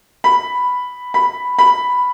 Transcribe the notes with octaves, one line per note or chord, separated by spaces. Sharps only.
B5
B5
B5